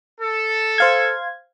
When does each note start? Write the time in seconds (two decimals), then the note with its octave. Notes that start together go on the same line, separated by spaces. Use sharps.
0.21 A4
0.78 C5 F5 G#6